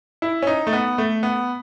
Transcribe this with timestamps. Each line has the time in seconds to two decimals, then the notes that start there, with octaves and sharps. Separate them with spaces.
0.22 E4
0.42 C#4
0.47 D#4
0.67 A3
0.73 B3
0.98 A3
1.23 B3